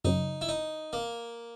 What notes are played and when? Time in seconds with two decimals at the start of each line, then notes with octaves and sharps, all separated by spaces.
0.04 F#2 C#3 F#3 D#4
0.41 E4
0.49 D#4
0.93 A#3